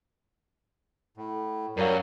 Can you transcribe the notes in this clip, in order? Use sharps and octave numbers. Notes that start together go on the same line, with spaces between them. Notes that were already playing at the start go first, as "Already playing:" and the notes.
A2
F#2 F#3 G3 A#4 C#5 F5